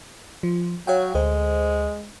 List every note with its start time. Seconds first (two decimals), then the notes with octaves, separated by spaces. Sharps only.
0.43 F3
0.87 F#3 C#5 F5 G5
1.15 D2 G#3 C5